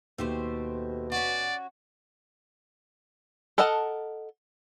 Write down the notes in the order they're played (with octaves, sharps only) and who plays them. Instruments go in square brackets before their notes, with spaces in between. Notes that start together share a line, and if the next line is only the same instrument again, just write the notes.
[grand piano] D#2 [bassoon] B2 [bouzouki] A3 G4 C5
[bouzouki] C#4 F#4 [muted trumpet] D5
[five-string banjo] A4 A#4 D#5 F#5 A5